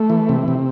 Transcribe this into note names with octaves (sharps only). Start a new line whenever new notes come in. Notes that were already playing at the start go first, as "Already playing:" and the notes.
Already playing: A3
E3
C3
C3